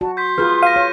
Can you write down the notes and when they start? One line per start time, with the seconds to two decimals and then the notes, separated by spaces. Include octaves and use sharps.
0.01 F#4 A5
0.17 C6 G6 B6
0.38 F4 G#4 B4 F6 G6
0.63 F5 A#6 D#7
0.76 C#5